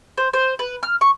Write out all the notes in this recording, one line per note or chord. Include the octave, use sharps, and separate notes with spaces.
C5
C5
B4
F6
C#6